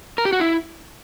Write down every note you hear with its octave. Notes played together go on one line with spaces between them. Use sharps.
A#4
G4
F#4
E4